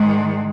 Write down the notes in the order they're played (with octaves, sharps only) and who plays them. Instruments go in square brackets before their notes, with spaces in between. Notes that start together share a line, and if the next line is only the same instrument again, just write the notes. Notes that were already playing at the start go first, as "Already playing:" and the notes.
Already playing: [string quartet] G#2 D#3 G#3